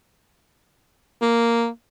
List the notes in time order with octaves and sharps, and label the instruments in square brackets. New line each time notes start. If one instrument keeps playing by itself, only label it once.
[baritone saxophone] A#3